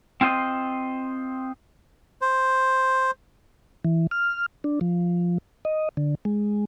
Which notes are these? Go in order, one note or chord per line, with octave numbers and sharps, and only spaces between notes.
C4 F4 C5 D#5
C5
E3
F6
D4
F3
D#5
D3
G#3